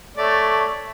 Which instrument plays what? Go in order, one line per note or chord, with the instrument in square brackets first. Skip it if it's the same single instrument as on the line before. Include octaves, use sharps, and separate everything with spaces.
[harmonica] A3 C#5 D5